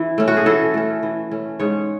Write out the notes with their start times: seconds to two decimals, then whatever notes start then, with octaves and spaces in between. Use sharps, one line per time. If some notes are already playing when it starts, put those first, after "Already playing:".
Already playing: E3 E4
0.18 A3 C#4
0.28 F#4
0.37 G#4
0.46 E3 A4
0.74 A3 C#4
1.03 E3
1.31 A3 C#4
1.60 G#2 C#5